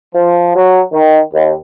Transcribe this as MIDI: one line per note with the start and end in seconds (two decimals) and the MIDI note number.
0.14 0.51 53
0.55 0.80 54
0.92 1.20 51
1.31 1.52 39